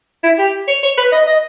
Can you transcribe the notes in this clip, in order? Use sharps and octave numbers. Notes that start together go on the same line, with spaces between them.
E4
G4
C#5
C#5
B4
D#5
D#5